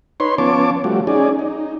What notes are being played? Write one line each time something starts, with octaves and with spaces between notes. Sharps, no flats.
D#4 B4 C#5 C6
F3 B3 C#4 C#5 A5 D6
F3 G3 A3 F#4
C#4 D#4 G#4 D5
D#4